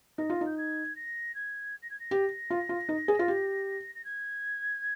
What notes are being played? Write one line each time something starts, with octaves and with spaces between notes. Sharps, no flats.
D#4 A#6
F4
D#4
G6
G#6
A#6
G#6
A#6
G#6
A#6
G4
F4
F4
D#4
G#4
F4
G4
A#6
G#6